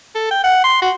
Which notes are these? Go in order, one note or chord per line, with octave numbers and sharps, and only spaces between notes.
A4
G5
F#5
C6
F#4